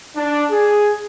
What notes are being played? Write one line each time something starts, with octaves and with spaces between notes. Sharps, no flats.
D4
G#4